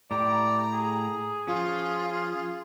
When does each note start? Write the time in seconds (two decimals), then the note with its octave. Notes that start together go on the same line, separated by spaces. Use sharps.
0.11 A2 G4 D5 A#5
0.73 G#4
1.47 F3 C#4 F4